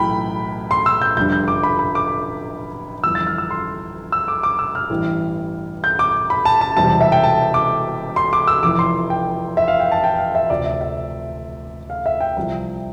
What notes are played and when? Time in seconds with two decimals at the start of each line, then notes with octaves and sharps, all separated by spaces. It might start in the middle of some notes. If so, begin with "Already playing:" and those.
Already playing: B1 A2 E3 G5 B5
0.71 C6
0.86 E6
1.01 G6
1.16 F1 F2 D3 G3 G6
1.32 G6
1.48 D6
1.63 B5
1.79 B5
1.95 D6
3.04 G1 F2 E3 E6
3.15 A6
3.27 F6
3.38 E6
3.51 C6
4.12 E6
4.28 D6
4.43 D6
4.59 E6
4.75 F6
4.90 A1 G2 E3
5.84 G6
5.99 D6
6.30 B5
6.45 A5
6.61 A5
6.77 E1 E2 C3 G3 A5
7.01 E5
7.12 G5
7.24 A5
7.54 D6
8.16 C6
8.33 D6
8.48 E6
8.63 F1 F2 E3 D6
8.79 C6
9.10 G5
9.57 E5
9.68 F5
9.80 G5
9.92 A5
10.04 G5
10.18 F5
10.35 E5
10.50 D2 C3 F3 D5
10.66 E5
10.81 E5
11.90 F5
12.06 E5
12.21 G5
12.37 C2 C3 F3